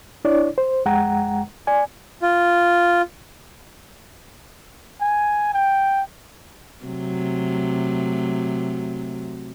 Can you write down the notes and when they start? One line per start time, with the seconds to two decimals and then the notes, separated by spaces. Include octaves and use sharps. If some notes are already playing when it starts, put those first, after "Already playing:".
0.25 D4 E4 C#5 D5
0.58 C5
0.85 F2 G#3 F#5 G5 A#5
1.67 D5 G#5
2.22 F4
5.02 G#5
5.54 G5
6.85 C3 F#3 A3